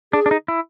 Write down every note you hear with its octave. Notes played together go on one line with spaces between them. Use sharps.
D4 G#4
D4
D#4
E4